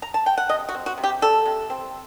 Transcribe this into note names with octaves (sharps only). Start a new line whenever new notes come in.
A#5
A5
G5
F#5
C3 D#5
F#4
C4
F#4
C3
G4
G3 A4
C3
C4